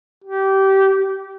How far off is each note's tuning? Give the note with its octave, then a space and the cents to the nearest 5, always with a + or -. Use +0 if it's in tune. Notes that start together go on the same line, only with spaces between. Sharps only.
G4 -20